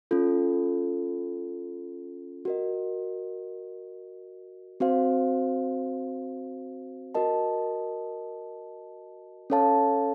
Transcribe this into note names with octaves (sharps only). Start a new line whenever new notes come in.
C#4 F4 A4
F#4 A#4 D#5
C4 F#4 C5 F5
F#4 A#4 D#5 A5
C#4 A4 C#5 F5 A5